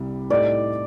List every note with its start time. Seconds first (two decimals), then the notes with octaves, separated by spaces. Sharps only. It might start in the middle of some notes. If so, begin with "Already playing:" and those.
Already playing: C2 C3 G3
0.30 A2 A3 D#4 G4 D5